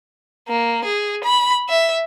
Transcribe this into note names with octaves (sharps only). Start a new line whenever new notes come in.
A#3
G#4
B5
E5